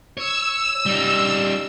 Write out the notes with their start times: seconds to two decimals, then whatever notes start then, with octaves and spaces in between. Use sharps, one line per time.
0.17 C#5 E6
0.86 G3 D#4